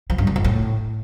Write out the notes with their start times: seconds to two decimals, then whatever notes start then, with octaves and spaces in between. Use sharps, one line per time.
0.10 F3
0.18 G2
0.27 E2
0.36 F2
0.44 A2